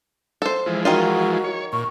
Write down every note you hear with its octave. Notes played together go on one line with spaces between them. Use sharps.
A4 C5
E3 F3 G#3
D#3 D#4 F4 F#4
C#5
A#2 C#6